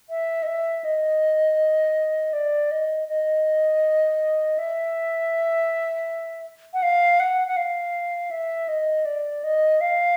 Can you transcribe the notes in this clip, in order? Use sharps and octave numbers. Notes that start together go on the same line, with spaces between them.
E5
D#5
E5
D#5
D5
D#5
D#5
E5
F#5
F5
F#5
F#5
F5
E5
D#5
D5
D#5
F5